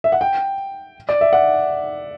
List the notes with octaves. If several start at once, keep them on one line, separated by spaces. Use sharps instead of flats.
E5
F#5
G5
D5
E5
F#5